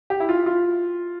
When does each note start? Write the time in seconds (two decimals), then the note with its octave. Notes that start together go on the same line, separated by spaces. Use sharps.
0.10 G4
0.20 E4
0.29 F4
0.46 F4